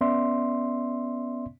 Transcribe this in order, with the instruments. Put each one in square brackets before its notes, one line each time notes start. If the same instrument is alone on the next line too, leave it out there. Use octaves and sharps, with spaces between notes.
[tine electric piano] B3 C#4 D5 E5 C6